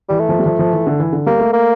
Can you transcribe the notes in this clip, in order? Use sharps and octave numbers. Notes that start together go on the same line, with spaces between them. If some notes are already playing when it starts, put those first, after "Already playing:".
E3 G3
A3
F3
G3
F3
F3
E3
D3
E3
D3
G3 A#3
A3
A#3